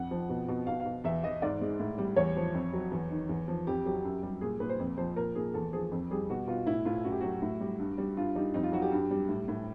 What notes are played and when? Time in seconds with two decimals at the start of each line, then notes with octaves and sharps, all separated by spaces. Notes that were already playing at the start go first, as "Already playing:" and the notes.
Already playing: F2 F#5
0.11 F3
0.29 B2
0.48 B2
0.67 B2 F5
0.80 F5
0.86 B2
1.04 E2 E5
1.23 E3 D#5
1.42 G#2 D5
1.61 G#3
1.80 A2
1.98 G3
2.16 E2 C#5
2.36 F3
2.54 F2
2.73 F#3
2.91 E2
3.11 D#3
3.29 E2
3.48 F3
3.67 F2 G4
3.85 F#3 G4
4.04 F#2
4.23 G3
4.41 A#2 G#4
4.60 A#2 B4
4.69 C5
4.80 F2
4.98 F3 C5
5.16 A#2 A#4
5.35 A#2 G#4
5.54 E2 A4
5.73 F3 G#4
5.92 F2
6.11 G3 G#4
6.29 B2 F#4
6.47 B2 F4
6.66 A2 E4
6.85 A2 F4
7.04 F#2 F#4
7.12 G4
7.20 F#3 F#4
7.42 A2
7.61 G3
7.79 G2
7.98 G3
8.17 G2 F4
8.35 G3 D#4
8.54 F2 D#4
8.63 F4
8.72 F#3 F#4
8.82 G4
8.92 G2
9.11 G3
9.28 A2
9.48 A2